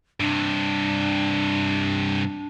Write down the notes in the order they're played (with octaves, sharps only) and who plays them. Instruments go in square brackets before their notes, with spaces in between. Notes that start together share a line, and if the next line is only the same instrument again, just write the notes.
[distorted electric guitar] G2 C3 [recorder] D4